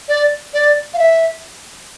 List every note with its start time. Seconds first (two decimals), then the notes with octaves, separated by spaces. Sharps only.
0.08 D5
0.53 D5
0.93 F5
0.98 E5